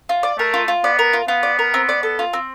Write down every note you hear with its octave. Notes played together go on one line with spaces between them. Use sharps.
F4
D5
A3 A#4
F4
F4
B3 D5
A#4
F4
B3 F4
D5
A#4
C4
D5
A4
F4
C4